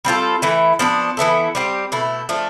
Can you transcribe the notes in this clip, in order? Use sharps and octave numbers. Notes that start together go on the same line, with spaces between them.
G3 C4 F4 A4
E3 A3 E4
F3 B3 D4
E3 B3 E4 A4
G3 C4 G4
B2 A3 E4
F3 A3 D4